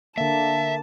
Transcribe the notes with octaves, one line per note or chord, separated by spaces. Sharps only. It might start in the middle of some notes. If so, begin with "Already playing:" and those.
D3 A#3 E5 A5